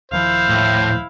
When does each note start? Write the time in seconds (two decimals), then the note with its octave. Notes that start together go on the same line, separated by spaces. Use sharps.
0.11 D#1 D#3 F3 E4 C5 F5
0.49 A2